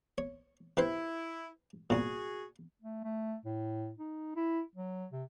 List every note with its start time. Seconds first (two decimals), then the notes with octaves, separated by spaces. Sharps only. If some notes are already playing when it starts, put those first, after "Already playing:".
0.18 C#5
0.77 C3 E4 B4 C5
1.90 C2 A#2 F#4 G#4
2.82 A3
3.04 A3
3.45 A2
3.98 D#4
4.36 E4
4.76 F#3
5.12 C3